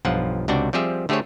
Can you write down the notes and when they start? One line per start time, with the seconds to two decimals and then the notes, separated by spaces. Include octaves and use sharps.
0.05 B1 G2 F3 F4 F#5
0.48 C#2 C3 D4 F#4 D5 G5
0.73 F3 G3 C4 G4 G#4 E5
1.09 D3 A3 G4 G#4 C5 C#5